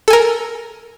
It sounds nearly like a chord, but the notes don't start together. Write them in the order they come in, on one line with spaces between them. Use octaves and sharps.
A4 G#5 A#4